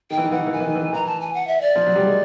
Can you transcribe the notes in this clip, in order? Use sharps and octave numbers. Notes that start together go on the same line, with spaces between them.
D#3 G5
E3
D#3
E3 F#5
D#3
E3
D#3 G#5
E3
D#3
E3
D#3
E3 A#5
A5
G#5
F#5
E5
D5
F3
F#3
G3
G#3